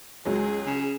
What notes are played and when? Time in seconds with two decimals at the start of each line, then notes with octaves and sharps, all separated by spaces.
0.25 C#2 F#3 G#3 G#4
0.66 C#3